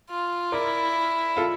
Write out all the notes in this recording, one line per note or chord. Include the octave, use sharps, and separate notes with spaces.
F4
E4 A#4 D5
F4 A4